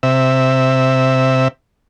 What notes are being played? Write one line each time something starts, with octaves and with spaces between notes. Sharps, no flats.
C3 E5